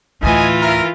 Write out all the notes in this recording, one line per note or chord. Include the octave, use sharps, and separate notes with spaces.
D2 A2 E3 F4 D#5 G#5
A#4 E5